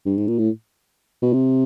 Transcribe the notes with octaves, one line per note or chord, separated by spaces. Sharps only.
G2
G#2
A#2
A2
B2
C3